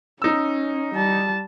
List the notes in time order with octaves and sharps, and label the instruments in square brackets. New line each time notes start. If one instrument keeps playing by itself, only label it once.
[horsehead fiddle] C#4 [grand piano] D#4 E6
[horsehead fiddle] G3 A5